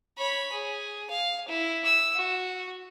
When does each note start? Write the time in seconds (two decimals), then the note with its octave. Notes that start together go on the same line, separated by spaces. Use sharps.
0.18 C#5 B5
0.52 G#4
1.10 F5
1.48 E4
1.85 E6
2.15 F#4